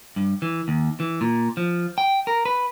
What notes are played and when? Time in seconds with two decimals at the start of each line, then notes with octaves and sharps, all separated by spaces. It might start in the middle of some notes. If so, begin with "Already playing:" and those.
0.16 G2
0.42 E3
0.68 D#2
1.00 E3
1.21 A#2
1.57 F3
1.98 G5
2.27 A#4
2.45 B4